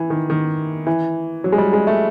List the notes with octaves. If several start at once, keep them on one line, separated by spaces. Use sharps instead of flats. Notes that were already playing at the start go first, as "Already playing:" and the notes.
Already playing: E3
D#3
D#3
E3
F#3
G#3
G3
G#3
A3